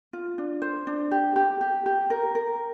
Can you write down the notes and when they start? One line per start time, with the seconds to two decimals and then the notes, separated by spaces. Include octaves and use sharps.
0.13 F4
0.38 D4
0.62 C5
0.87 D4
1.11 G4
1.36 G4
1.61 G4
1.86 G4
2.10 A#4
2.35 A#4